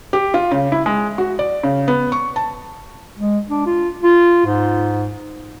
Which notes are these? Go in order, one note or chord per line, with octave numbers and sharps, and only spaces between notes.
G4
F4
C#3
E4
G#3
F#4
D5
C#3
B3
C#6
A5
G#3
D4
F4
F4
G#2